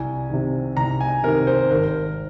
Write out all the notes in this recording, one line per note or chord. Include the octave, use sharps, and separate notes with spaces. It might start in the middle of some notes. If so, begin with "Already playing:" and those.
Already playing: C2 G#5
C3 D#3
C2 A#5
G#5
C3 D#3 A#4
C5
G#1 A#4